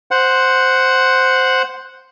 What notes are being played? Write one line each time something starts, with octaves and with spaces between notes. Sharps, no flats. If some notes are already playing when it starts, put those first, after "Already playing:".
C5 F#5